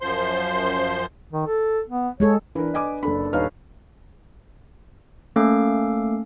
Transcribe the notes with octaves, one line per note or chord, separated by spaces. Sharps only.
F#2 F3 C5 C6
D#3
A4
B3
G#3 G#4 A4 C#5
E3 D4 A#4 B4
D#5 G#5 D6
F#1 D4 A4 B5
D#1 D#4 B4 C#5 F5 F6
A3 A#3 C#4 A4 F5 D6